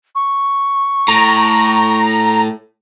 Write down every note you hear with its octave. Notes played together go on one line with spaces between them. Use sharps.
C#6
A2 A#5